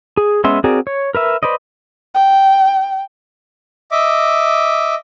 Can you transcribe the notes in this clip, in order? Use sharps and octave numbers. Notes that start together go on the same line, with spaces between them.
G#4
G#3 B3 C#4 E5 C6
C4 F#4 G#4 A#4 D5
C#5
A#4 B4 E5
B4 C5 D5 D#5
G5
D#5 E5 D6